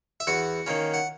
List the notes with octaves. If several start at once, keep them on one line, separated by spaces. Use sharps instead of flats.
E5
E2 F#4 F#5
D#3 A#3 C#4
F#5